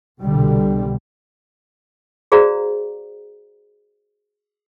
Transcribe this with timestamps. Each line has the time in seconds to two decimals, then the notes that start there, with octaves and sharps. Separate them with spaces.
0.21 C2 B2 D3 G3
2.32 F#4 G#4 C5 D5 F5 A#5